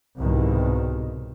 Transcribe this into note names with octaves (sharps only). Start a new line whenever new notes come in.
C2 G#2 B2 D#3